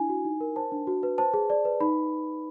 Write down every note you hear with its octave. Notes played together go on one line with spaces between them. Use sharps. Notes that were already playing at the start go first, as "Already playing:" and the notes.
Already playing: D4 E4 G#5
F#4
D#4
A#4
C5 A5
D4
F#4
B4
C5 A5
G#4
D5
B4
D#4 B5